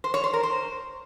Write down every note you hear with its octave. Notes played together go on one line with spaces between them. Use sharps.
C5
C#5
C5
A#4
C5